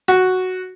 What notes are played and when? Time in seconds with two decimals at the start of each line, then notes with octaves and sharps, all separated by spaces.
0.08 F#4